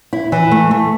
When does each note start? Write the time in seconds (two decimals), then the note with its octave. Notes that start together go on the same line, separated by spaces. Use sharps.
0.13 E4
0.32 E3
0.51 A3
0.71 A3